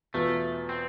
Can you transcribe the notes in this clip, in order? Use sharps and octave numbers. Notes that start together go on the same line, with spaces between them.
E2 B2 A3 B3 F4
C4